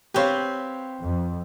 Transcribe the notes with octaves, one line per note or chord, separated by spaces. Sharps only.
C4 G4 B4 C#5 F5
F2